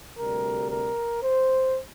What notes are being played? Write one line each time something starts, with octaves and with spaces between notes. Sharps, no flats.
D2 C3 G3 A#4
A#4
C5